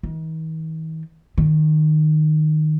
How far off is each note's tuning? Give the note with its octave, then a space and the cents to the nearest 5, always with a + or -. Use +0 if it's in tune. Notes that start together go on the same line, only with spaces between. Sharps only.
D#3 +45
D#3 -15